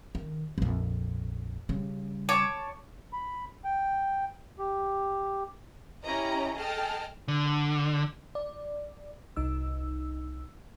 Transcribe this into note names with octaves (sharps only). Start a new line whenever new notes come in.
D#3
A#1 F2
C#3 G3
C#5 A5 D6
B5
G5
G4
C#4 E4 G4 C#5 D#5 A#5
G#4 A4 D#5 G5 A5 F6
D3
D5
C2 D#4 E6